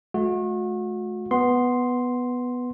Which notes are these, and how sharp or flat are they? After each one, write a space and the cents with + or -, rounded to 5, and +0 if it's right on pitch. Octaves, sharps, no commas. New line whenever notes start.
A3 -40 F#4 -40
B3 +0 C6 +0